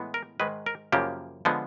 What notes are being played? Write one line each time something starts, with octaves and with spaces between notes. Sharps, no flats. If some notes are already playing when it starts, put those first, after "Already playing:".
Already playing: A2 E3 G#3 B3
A#4
G#2 D#3 G#3 B4
A#4
F#2 C#3 F3 A#3 G4
D3 F3 G#3 B3